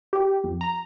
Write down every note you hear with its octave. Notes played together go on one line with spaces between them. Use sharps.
G4
F2
A#5